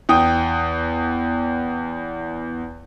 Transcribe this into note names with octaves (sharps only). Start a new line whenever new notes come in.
E2 G5 D#6